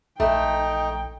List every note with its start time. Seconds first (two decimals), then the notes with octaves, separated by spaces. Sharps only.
0.20 A#1 A3 D#4 G5